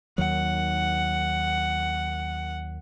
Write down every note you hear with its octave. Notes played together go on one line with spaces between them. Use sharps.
D#2 D#3 F#3 F#5